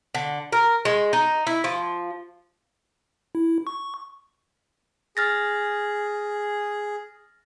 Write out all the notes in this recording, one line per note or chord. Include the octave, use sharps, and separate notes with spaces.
D3
A#4
G#3
D#4
E4
F3
E4
C#6
G#4 F6 A6 A#6